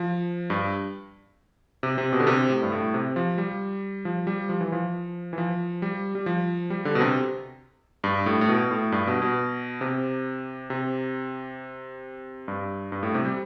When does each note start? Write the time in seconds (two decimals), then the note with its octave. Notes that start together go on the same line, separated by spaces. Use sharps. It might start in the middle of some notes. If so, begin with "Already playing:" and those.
Already playing: F3
0.50 G2
1.83 C3
1.98 C3
2.13 B2
2.20 D3
2.27 C3
2.50 A2
2.63 G2
2.72 A2
2.94 C3
3.16 F3
3.38 G3
4.05 F3
4.27 G3
4.49 F3
4.61 E3
4.72 F3
5.33 E3
5.38 F3
5.82 G3
6.15 G3
6.26 F3
6.70 G3
6.85 D3
6.95 B2
7.01 C3
8.04 G2
8.26 A2
8.41 A2
8.48 B2
8.71 A2
8.92 G2
9.07 B2
9.22 B2
9.81 C3
10.70 C3
12.48 G2
12.92 G2
13.03 A2
13.14 C3
13.25 G3